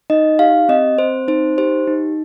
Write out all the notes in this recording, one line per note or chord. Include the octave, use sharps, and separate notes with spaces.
D#4 D#5
G4 F5
C4 D#5
C4 C5
D#4 C5
G4 C5
D#4